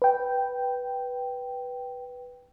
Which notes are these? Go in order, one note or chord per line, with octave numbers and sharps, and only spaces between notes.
B4 G5